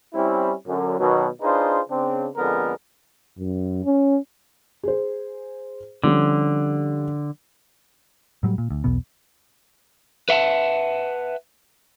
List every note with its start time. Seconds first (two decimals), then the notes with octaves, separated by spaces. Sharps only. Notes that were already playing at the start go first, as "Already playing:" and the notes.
0.14 G3 C4 C#4 E4
0.68 F#2 D3
0.99 B2 D#3 F#3
1.42 D4 D#4 F4 G#4 B4 C5
1.90 C#3 C4 D4
2.37 F2 D3 G#3 B3 A#4
3.38 F#2
3.85 C#4
4.83 G#4 C5
6.04 D3 F3 G3 C#4
8.43 A2 F#3 G3
8.58 A#2
8.71 D2
8.84 B1 E2 B2 B3
10.29 B4 E5 F#5 A5